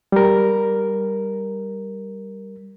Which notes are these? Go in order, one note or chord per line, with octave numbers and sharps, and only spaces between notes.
G3 A#4